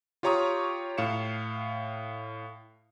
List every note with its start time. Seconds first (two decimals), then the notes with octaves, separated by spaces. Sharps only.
0.23 F4 G4 C#5 A#5 C#6 D#6
0.97 A2 F5 C#7 E7